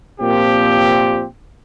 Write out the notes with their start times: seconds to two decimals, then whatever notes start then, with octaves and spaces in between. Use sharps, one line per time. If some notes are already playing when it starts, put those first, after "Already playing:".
0.21 A#2 F3 C4 G4